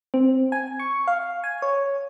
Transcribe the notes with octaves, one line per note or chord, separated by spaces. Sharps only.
C4
G#5
C#6
F5
G#5
C#5